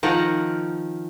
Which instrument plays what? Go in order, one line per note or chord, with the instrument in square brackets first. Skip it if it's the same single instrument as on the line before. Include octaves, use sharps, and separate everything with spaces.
[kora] D#3 F3 A#4 F#5